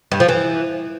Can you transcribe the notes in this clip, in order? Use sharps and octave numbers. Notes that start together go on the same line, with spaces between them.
G2
F3
E3